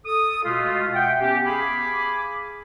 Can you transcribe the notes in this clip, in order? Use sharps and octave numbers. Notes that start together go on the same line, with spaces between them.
A4 D#6
B2 G#3 A3 F4
E5 F#5 G5
B3 C#4 G4
G#4 F5 G#5 B5 D6